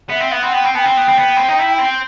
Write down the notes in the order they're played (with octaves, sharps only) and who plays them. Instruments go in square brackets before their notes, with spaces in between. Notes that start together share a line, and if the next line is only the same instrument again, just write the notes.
[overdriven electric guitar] B3 [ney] E5
[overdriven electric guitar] C4
[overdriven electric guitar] B3 [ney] F#5
[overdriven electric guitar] C4
[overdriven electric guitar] B3 [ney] G5
[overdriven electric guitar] C4
[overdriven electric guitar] B3 [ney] G5 A5
[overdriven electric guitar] C4
B3
C4
B3
C4
D#4
E4
C4